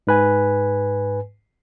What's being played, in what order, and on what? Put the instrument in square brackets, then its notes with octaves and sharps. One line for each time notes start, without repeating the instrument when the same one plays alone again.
[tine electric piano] G#2 B4 G#5